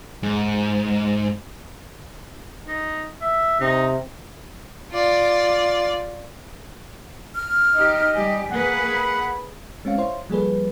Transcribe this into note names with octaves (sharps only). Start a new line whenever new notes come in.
G#2
D#4
E5
C3 D#4
F4 D5
F6
D#4 G4 D#5
G3 G4 G#5
A#3 G#4 B4 F#5
B5
G#3 C4 C#4 C#5 F5
E4 C5 C#5 F5 C6
F3 G3 A#3 G#4 A4 B4